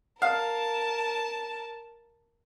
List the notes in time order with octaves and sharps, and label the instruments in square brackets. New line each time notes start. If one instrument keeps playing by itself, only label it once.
[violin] A#4 A5 [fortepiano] F5